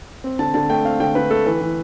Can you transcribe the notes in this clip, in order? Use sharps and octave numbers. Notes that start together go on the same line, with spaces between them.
C4
D3 A5
D3 A5
A3 G5
C4 F5
D3 G5
D3 B4
A3 A4
E3 B4
E3